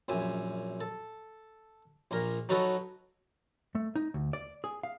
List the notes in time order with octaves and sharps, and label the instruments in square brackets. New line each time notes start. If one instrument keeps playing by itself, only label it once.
[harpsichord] A#1 F#2 E5 G#5
A4
A#1 A#2 A#4
F#3 D#4 F#4 A4 B4 C#5
[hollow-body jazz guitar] A3
D#4
D2
D5
G#4
F5